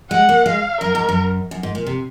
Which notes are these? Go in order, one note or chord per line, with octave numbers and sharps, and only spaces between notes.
G#3 F#5
A#3
G#3 F5
F#2 A#4
G#2
F#2
F#2
G#2
A#2
C3